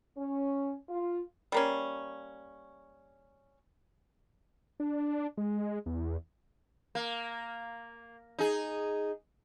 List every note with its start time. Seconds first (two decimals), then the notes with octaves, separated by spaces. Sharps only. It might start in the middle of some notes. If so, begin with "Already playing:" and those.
0.18 C#4
0.89 F4
1.52 G3 A#3 C#4
4.80 D4
5.37 G#3
5.86 E2
6.95 A#3
8.39 D#4 G#4